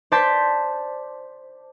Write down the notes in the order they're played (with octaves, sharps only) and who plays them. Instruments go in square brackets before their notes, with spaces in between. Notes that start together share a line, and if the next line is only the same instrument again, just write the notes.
[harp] C5 D5 A5 G6 G#6 B6